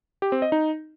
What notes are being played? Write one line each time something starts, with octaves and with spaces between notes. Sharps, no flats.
G4
C4
D#5
D#4